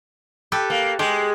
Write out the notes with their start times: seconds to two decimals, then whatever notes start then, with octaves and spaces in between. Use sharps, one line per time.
0.52 G4 A4 B4
0.70 A#3
0.99 G#3 G4